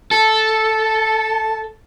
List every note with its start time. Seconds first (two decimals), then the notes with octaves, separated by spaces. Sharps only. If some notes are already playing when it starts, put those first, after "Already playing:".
0.11 A4 A5